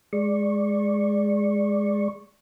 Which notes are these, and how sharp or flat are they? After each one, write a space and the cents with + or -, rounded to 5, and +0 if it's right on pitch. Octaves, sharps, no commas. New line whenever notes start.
G#3 +0 D5 +0 C#6 -20